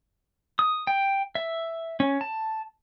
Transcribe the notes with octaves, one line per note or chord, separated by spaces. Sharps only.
D#6
G5
E5
C#4
A5